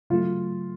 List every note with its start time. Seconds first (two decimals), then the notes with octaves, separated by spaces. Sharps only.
0.10 C#3 F#3 A3 F4